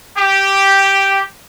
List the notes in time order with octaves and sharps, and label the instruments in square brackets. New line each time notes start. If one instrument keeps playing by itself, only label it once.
[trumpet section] G4